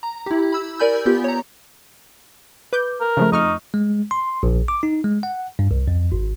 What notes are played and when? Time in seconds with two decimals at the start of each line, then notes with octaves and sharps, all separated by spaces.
0.03 A#5
0.26 E4 G4
0.52 B5 E6
0.79 A#4 D5 G#5 B5 E6 G6
1.06 B3 F4 G4 G6
1.24 C#5 A#5
2.73 B4 D6 G6
3.00 A#4
3.17 C#3 F3 A3
3.32 F2 D#4 C#6 F6
3.74 G#3
4.11 C6
4.43 A#1
4.68 D6
4.83 D#4
5.04 G#3
5.23 F#5
5.59 G2
5.71 C2
5.88 F2
6.12 G#1